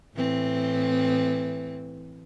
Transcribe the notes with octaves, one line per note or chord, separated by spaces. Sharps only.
A2 E3 C4